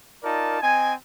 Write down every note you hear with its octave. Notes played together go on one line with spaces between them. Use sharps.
D#4 F4 A#4 D5 A5
C4 D#5 G#5